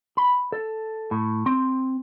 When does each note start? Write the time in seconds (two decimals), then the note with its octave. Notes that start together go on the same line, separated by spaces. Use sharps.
0.17 B5
0.52 A4
1.11 A2
1.46 C4